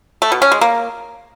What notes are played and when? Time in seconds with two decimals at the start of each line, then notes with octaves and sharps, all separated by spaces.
0.22 A3
0.32 B2
0.42 C#4
0.52 G#3
0.61 A#3